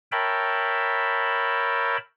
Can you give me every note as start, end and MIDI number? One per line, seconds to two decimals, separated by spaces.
0.12 1.97 70
0.12 1.97 73
0.12 1.97 76
0.12 1.97 79
0.12 1.97 81
0.12 1.97 83